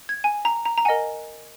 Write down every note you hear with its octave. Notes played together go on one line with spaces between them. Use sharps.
G#6
G#5
A#5
A#5
A#5
A#4 D#5 F#5 G#5